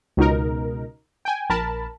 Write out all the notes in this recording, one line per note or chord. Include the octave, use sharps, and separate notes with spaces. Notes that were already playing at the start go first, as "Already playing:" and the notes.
C#2 B2 D#4 A#4
G5 G#5
A#1 A#4 A5 B5